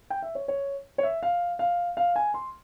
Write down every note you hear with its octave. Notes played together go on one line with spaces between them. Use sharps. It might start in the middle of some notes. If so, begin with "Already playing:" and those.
G5
E5
C#5
C#5
C#5
E5
F5
F5
F5
G#5
C6